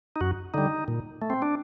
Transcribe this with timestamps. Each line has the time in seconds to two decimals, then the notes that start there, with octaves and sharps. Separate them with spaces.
0.16 D#4
0.21 F#2 F#4
0.54 D3 G3 D#4
0.88 A#2
1.22 A3
1.30 C4
1.42 D4